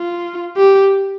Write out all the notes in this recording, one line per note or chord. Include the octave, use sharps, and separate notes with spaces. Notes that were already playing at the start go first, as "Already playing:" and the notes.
Already playing: F4
G4